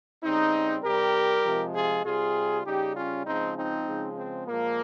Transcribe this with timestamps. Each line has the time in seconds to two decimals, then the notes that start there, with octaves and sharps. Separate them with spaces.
0.23 C#3 G3 C4 D#4
0.84 C3 G3 G4 A#4
1.45 C3 F3 G#3
1.75 F4 G#4
2.05 C3 G3 F4 G#4
2.66 C#3 G3 D#4 G4
2.96 C#4 F4
3.26 C#3 F3 G#3 C4 D#4
3.57 C4 D#4
3.87 C#3 F3 G#3
4.17 C4
4.48 A#2 F3 G#3 A#3